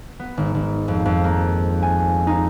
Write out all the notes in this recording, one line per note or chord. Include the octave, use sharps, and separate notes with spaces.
B3
G#1
G#1
F2
F2
A#3
G#5
D#4